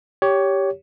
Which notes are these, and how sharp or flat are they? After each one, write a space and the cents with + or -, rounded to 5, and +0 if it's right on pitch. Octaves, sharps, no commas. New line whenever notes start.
G4 +0 C#5 +15